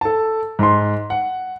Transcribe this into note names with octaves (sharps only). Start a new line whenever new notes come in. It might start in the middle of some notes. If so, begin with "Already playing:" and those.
A4 A5
G#2 C6
F#5